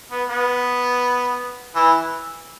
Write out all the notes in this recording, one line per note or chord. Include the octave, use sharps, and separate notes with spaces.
B3
B3
E3